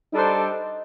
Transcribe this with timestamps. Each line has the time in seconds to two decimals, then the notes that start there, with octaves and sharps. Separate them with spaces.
0.12 G3 D4 D#4 A4 C5